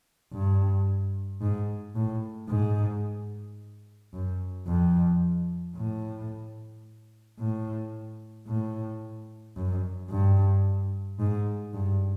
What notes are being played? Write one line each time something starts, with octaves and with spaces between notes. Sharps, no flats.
G2
G#2
A2
G#2
F#2
F2
A2
A2
A2
F#2
G2
G#2
G2